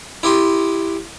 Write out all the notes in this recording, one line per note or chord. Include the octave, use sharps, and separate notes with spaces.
E4 G4 C6 D#6